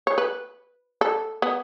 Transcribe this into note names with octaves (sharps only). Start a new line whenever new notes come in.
C#5
B4
A4
B3